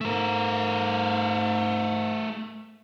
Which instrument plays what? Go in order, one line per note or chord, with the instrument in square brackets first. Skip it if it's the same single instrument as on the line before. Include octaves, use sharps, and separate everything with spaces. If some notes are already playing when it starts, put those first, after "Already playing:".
[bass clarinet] G#2 [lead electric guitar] A3 A#4